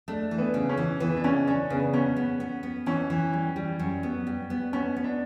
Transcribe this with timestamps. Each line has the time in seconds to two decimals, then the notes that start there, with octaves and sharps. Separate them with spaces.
0.08 A3 D4
0.31 E3
0.38 B3
0.54 C#3
0.69 C#4
0.77 E3
1.00 E3 B3
1.16 D4
1.24 C#3 C#4
1.47 C#4 D4
1.70 C#3 B3
1.93 B3 C#4
2.16 B3
2.40 B3
2.63 B3
2.86 E3 C#4
3.10 E3
3.33 G3
3.56 G3
3.79 F#2
4.03 B3
4.27 G3
4.50 B3
4.73 B3 C#4
4.97 B3
5.04 D4